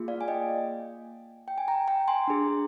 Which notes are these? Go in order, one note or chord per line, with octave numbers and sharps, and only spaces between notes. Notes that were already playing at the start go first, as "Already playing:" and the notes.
Already playing: A#3 F4 G#4
D5 F5
G#5
D#5 G5
G5
G#5
G5 A#5
G5 A#5
G#5 C6
D4 G#4